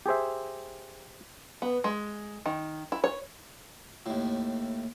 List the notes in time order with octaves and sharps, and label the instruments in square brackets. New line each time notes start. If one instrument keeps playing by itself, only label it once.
[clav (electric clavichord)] G4 G#4 C5 E5
[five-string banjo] B3
G#3
D#3
E4
C#5
[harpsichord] D#2 A2